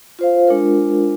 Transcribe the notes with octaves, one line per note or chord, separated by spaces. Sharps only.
F4 C5 F5
G#3 D4 F4 A#4